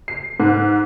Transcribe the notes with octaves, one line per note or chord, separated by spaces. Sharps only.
C7
G#2